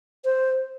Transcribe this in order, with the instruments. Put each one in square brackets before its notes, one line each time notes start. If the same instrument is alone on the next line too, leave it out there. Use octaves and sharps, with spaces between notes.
[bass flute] C5